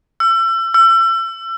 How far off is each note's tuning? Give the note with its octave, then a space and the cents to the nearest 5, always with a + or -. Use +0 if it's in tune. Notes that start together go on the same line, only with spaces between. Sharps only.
E6 +35
E6 +35